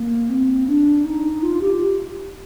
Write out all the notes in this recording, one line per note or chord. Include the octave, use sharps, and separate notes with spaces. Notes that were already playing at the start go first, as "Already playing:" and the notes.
Already playing: A#3
C4
D4
D#4
F4
G4